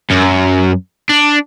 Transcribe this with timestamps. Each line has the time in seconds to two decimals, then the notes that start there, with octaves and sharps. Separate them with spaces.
0.10 F#2
1.09 D4